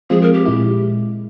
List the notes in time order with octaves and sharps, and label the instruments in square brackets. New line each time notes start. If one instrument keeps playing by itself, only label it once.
[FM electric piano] F3 G#3 C4 F4 [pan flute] G#4
[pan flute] A#4
G4
[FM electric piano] A#2 G#3 E4